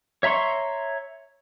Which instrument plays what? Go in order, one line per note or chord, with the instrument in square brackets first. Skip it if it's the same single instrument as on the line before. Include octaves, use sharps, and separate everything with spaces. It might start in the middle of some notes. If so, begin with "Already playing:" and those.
[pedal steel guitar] C#5 E5 A#5 C6 C#6